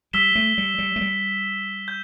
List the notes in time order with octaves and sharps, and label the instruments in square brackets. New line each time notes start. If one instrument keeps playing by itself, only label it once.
[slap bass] G3 [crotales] E6 B6 E7 G7
[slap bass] A3
G3
G3
A3
G3
[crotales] G6